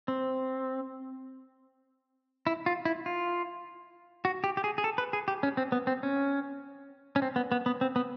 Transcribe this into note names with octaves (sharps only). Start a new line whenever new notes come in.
C4
E4
F4
E4
F4
F#4
G4
G4
G#4
G#4
A4
B4
G#4
G4
C#4
C4
B3
C4
C#4
C#4
C4
B3
B3
B3
C4
B3